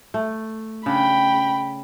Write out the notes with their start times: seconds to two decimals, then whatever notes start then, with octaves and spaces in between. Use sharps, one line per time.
0.14 A3
0.86 C#3 D4 G5 B5